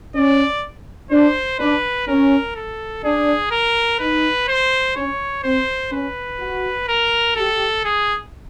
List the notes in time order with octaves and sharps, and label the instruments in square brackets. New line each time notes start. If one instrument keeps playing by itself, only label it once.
[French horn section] C#4 [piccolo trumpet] D5
[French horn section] D4 [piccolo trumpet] C5
[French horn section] D4 [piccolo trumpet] B4
[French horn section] C#4 [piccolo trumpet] A#4
[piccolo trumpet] A4
[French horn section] D4 [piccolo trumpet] G#4
[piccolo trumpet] A#4
[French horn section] D#4 [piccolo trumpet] B4
[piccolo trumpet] C5
[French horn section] C#4 [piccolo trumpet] C#5
[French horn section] C4 [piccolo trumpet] C5
[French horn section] C#4 [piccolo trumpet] B4
[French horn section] F#4
[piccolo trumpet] A#4
[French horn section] G4 [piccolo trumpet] A4
[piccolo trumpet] G#4